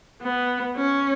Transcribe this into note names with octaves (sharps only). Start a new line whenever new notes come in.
B3
C#4